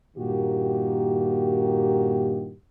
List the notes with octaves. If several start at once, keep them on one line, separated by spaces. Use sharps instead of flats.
G2 A#2 D#3 A#3 F#4 G4